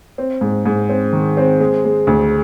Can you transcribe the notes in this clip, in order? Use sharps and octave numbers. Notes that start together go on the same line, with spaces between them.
C4
G#2
G#2
C4
D#3
C4
G#3
G#3
D2